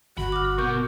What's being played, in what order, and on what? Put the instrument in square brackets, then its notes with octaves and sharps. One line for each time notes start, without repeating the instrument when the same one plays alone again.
[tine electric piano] G1 [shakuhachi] F#4 [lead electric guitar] B5
[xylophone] D6 F6
[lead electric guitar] B2 B3 [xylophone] A#4 G6 [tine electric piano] C#6